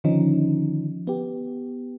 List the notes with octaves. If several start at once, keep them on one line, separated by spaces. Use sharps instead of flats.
D3 D#3 F3 C#4 D#4
B3 G4